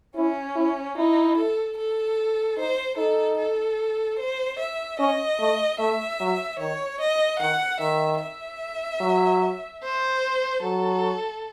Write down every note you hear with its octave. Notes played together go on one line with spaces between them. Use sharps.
C#4 E4
E4
D#4 E4
A4
A4
D#4 C5
D#4 A4
A4
C5
E5
C#4 D#5
A3
A3 E5
F#3
D#3 C#5
D#5
D#3 F#5
D#3 E5
E5
F#3
C5
F#3 A4